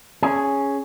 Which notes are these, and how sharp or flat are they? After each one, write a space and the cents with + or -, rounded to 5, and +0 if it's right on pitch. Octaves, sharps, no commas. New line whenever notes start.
C#4 +0 G#4 +0